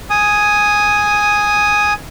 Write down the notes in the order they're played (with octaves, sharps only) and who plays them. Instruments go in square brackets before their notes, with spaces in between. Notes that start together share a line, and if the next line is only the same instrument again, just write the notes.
[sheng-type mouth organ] G#5 D#6